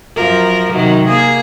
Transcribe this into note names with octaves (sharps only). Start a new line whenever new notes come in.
F#2 F3 A#4
C3 D#3 F#3
A#3 G#4